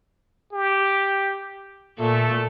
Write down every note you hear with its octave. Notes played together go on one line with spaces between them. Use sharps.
G4
A#2 A3 A4